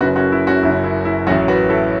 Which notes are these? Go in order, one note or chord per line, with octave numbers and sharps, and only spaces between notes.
F#1 F#2 C#3 F#4 B4
C#4 F#4
E4
C#4 F#4
F#1 F#2 C#3 E4
E4
E4
A1 A2 F#3 C#4 F#4
F#4 B4
E4 A4